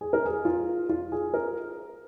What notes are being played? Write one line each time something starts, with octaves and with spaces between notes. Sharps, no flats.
G#4
A#4
G#4
F4
F4
G#4
A#4